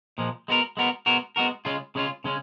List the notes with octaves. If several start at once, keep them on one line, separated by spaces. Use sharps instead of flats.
A#2 F3 G#3
G#3 B3 F#4 A#4
G#3 B3 F#4 A#4
G#3 B3 F#4 A#4
G#3 B3 F#4 A#4
C#3 G#3 C#4 F4
C#3 G#3 C#4 F4
C#3 G#3 C#4